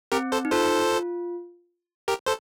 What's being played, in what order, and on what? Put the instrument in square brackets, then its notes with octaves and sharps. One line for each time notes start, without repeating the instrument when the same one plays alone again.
[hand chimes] C4 [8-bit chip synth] G4 A#4
[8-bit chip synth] A4 C5
[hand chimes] D#4
[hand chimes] F4 [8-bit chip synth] A4 C5
[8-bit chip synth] G4 A#4
A4 C5